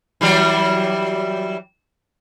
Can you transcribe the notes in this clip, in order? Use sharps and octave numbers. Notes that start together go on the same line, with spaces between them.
E3 F#3 G3